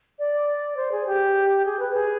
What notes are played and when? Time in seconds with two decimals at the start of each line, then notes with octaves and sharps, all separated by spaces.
0.19 D5
0.77 C5
0.92 G#4
1.07 G4
1.65 G#4
1.79 B4
1.94 G#4